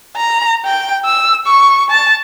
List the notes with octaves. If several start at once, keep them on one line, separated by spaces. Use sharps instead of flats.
A#5
G5
E6
C#6
A5